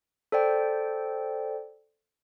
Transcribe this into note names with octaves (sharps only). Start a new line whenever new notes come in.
A4 C5 D5 G5